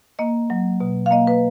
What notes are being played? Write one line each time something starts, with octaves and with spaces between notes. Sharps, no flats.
A#3 D#5
F#3
B2
F5
A#3 D#5
B4